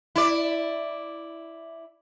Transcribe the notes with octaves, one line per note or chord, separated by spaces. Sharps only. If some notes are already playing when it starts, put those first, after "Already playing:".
E4 D5